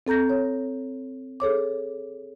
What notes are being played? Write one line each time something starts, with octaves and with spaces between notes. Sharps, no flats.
C4 A4 A#5 G6 A#6
C#5
G#4 A4 C#5 D6